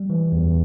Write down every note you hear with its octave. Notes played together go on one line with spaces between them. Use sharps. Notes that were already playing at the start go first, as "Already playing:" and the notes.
Already playing: G3
E3
E2